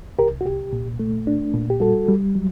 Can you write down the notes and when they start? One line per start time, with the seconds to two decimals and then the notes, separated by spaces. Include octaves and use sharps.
0.19 C2 G4 A#4
0.41 F#4
0.45 C2 G4
0.73 A#2
0.99 A3
1.27 D4
1.54 A#2
1.70 G4
1.80 G3 F#4 A4
2.08 G3
2.35 F#3